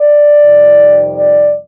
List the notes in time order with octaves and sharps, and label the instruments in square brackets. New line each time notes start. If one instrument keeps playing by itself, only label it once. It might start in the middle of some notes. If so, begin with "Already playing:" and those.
Already playing: [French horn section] D5
F2 C3 D#3 G3
D5